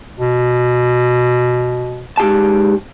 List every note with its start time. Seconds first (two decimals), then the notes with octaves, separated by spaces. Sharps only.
0.20 B2
2.17 G#2 G4 A5